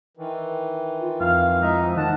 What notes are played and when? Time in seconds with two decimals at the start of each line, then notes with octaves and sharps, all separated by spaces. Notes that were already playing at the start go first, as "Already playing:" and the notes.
0.17 D#3 E3
1.00 F4
1.20 F2 F5
1.62 E3 G#3 D#4 E5
1.83 F3
1.97 D#3 A#3 F#5 A5